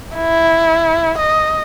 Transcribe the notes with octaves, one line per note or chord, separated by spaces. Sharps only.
E4
D#5